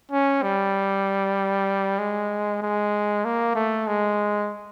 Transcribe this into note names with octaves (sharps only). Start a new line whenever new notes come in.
C#4
G3
G#3
G#3
A#3
A3
G#3